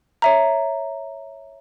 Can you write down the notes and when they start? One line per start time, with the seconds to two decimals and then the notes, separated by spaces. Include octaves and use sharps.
0.22 C#5 E5 A#5